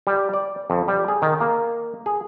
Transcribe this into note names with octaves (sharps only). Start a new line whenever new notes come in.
G3
D5
F2
G3
G#4
D#3
A#3
G#4